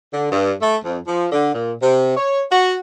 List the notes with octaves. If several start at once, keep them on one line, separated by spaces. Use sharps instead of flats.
D3
G2
A3
F2
F3
D3
A#2
C3
C#5
F#4